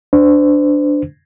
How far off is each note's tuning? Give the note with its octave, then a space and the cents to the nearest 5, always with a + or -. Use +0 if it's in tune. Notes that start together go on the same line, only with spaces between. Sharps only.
D4 +0 C5 -35